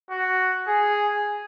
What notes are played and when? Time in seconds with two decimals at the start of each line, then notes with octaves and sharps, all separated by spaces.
0.11 F#4
0.68 G#4